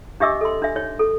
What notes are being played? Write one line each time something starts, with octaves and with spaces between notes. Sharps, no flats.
D4 G4 D#5 E5 D6 E6
A4 C6
D4 E5
D#4 C#5
A4